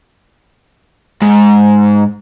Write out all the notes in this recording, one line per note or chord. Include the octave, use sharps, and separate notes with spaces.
G#2